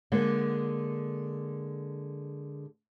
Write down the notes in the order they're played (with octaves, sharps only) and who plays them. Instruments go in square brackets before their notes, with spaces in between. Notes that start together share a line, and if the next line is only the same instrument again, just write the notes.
[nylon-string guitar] D3 G#3 A#3 B3